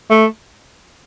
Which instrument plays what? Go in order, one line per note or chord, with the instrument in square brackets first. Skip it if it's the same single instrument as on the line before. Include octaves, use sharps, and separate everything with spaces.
[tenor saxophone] A3